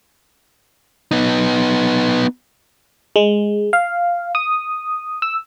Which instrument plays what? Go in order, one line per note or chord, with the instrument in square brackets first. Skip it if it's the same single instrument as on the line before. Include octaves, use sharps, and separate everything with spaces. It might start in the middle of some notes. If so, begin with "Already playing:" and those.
[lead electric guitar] B3 D#4
[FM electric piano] G#3
F5
D#6
E6